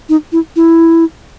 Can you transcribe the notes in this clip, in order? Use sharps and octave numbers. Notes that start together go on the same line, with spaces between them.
D#4
E4
E4